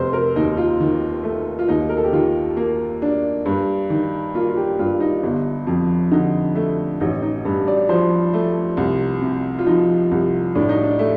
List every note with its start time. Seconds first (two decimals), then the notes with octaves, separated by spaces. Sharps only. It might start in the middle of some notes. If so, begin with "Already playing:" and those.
Already playing: F1 C5
0.13 A#4
0.35 D#2 D#4
0.57 F4
0.80 D#3
1.24 A3
1.59 F4
1.68 D#2 D#4
1.89 A#4
1.97 A4
2.04 G4
2.12 D#3 F4
2.57 A#3
3.02 D4
3.46 G2
3.90 D#3
4.35 A#3 F4
4.49 F4
4.57 G4
4.79 G2 F4
5.00 D#4
5.23 G1
5.67 F2
6.11 D3 D#4
6.55 A3
7.00 A1 D#4
7.22 D#4
7.45 G2
7.68 D5
7.89 F3 C5
8.33 A3
8.77 C2
9.21 C3
9.59 F4
9.66 F3 D#4
10.11 C2
10.55 A2 D4
10.69 D#4
10.84 D4
10.99 A3